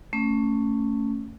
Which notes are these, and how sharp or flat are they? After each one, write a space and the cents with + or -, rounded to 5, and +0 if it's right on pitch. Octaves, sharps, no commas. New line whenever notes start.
A3 +20 C#4 +0